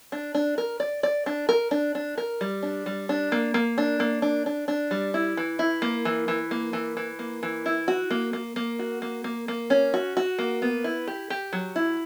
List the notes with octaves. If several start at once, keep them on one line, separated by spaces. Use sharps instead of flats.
D4
D4
A#4
D5
D5
D4
A#4
D4
D4
A#4
G3
D4
G3
D4
A#3
A#3
D4
A#3
D4
D4
D4
G3
E4
E3
E4
A#3
E3
E3
A#3
E3
E3
A#3
E3
E4
F#4
A#3
A#3
A#3
F#4
A#3
A#3
A#3
C#4
F#4
F#4
A#3
B3
E4
G4
G4
F#3
E4